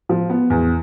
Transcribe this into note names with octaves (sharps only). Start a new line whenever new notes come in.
F3
B3
E2